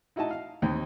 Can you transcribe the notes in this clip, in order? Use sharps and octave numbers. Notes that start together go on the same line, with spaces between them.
D#4 E4 F#4 D#5 A5
F5
D#2 C4 D#4